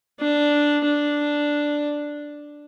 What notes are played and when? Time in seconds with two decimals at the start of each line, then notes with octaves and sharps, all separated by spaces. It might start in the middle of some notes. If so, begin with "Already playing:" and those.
0.20 D4
0.84 D4